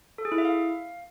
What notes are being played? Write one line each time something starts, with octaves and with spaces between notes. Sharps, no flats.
A4
G#4
E4
E5
F5